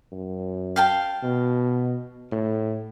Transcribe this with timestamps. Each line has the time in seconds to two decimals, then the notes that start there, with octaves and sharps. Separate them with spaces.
0.12 F#2
0.76 F5 G5 A5
1.23 B2
2.32 A2